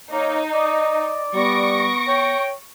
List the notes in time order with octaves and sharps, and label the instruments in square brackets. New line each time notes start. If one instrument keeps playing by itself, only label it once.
[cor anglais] A#3 [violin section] D#4 [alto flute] C#5
[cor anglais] D5 [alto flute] D#5
[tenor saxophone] G3 [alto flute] B3 [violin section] C#6 A#6 D7
[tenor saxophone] C#5 [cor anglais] G5